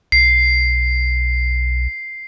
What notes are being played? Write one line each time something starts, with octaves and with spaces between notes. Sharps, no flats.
B1 C7